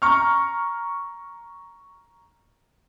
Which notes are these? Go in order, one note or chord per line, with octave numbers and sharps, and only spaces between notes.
A#5 C#6 F6